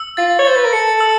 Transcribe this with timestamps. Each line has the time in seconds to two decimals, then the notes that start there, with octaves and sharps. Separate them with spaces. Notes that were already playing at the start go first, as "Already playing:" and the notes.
Already playing: E6
0.17 F4 A6
0.39 C#5
0.45 C5 A6
0.56 B4
0.65 A#4
0.73 A4 C#7
1.00 E6